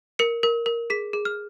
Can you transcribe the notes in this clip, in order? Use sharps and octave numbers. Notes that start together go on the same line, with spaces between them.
A#4 C#7
A#4
A#4
G#4 B6
G#4
F6